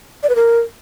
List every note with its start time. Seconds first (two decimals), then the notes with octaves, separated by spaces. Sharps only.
0.23 D5
0.29 B4
0.36 A#4